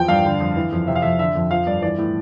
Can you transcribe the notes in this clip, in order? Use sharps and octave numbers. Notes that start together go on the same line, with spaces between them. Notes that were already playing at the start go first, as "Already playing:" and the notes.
Already playing: E2 F3 G5
G2 F5
D3
F2
E3
F2
C3 E5
F5
F2 E5
D3 E5
F2
F3 F5
G2 D5
E3 D5
A2